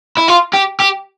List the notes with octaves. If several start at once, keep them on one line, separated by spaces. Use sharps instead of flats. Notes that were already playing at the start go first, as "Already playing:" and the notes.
E4
F4
G4
G4